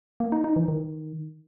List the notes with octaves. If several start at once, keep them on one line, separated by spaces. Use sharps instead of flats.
A#3
D#4
D#4
E3
D#3